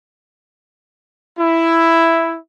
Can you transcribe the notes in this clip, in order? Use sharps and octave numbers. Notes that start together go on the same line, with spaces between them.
E4